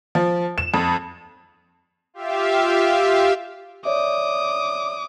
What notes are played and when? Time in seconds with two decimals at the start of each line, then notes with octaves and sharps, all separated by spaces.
0.15 F3
0.58 E7
0.74 F2
2.14 F4 G4 E5 F5
3.85 C#5 D5 E5 D6 D#6